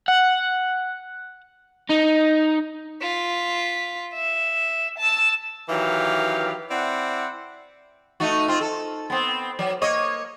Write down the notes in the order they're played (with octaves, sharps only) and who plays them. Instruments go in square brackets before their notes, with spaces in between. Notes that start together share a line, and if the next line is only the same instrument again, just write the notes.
[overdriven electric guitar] F#5
D#4
[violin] F4 B6
E5
A5 E6
[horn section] D#3 E3 F#3 G4 F5
C4 E4 D5 F#5
[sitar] A3 D#4 F#4
C4 F4
A4
B3 C4
F#3
A#3 C#5 D#5